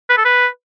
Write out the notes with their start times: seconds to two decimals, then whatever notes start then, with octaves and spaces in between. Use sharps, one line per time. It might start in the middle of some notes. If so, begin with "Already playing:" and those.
0.10 B4
0.17 A4
0.25 B4